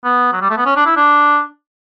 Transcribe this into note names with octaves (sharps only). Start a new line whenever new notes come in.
B3
F#3
G3
A3
B3
C#4
D4
E4
D4